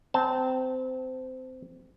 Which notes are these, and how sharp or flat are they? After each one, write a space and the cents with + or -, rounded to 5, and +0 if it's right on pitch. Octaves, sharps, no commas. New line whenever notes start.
C4 -20 A5 +0